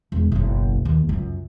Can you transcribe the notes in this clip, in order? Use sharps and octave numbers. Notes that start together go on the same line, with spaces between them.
E1
F#1 B1
D#2
C#2 F#2